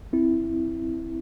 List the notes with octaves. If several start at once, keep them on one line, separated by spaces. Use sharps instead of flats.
C4 E4